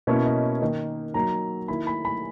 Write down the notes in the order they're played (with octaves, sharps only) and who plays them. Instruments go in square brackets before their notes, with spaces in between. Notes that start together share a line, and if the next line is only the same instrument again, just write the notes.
[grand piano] B2 A#3 C#4 E4 C#5
D#5
D#3 A#3 D#4
F#3 A#3 D#4 A#5
D#3 A#3 E4 B5
B5
B5